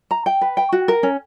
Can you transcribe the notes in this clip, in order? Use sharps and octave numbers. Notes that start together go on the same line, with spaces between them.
A#5
G5
B4
G5
F#4
A#4
C#4